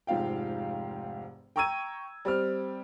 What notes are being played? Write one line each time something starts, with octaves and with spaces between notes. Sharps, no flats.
F1 G#2 F3 F5 G5
G5 A#5 C#6 E6 G#6 D#7
G3 C4 F6